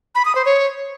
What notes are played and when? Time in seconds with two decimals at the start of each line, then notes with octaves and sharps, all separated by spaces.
0.15 B5
0.25 D#6
0.35 C5
0.45 C#5